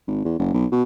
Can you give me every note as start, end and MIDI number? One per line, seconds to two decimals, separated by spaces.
0.08 0.24 32
0.25 0.35 40
0.39 0.52 30
0.54 0.66 35
0.72 0.83 47